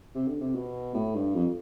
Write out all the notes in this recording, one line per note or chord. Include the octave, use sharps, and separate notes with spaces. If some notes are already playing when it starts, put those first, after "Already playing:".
C3
D3
C3
B2
A2
G2
F2